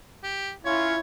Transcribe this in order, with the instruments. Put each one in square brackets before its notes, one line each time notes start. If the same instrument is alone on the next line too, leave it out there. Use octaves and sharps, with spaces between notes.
[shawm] G4
[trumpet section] C#4 F4 [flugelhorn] E4 [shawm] C#5